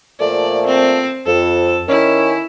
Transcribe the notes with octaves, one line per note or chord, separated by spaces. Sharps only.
A#2 F3 A3 D5
C4
F2 A4
D#3 C#4 E4